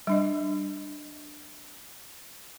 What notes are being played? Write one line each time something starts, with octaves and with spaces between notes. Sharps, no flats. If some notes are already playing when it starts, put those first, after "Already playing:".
G3 D4 D#5